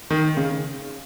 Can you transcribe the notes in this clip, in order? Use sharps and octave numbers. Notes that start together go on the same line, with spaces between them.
D#3
C#3